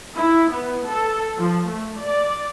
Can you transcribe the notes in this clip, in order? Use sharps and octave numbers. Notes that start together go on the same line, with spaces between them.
E4
B3
A4
F3
A3
D5